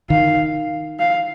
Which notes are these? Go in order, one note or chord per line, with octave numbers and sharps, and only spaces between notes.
D#3 F5
F5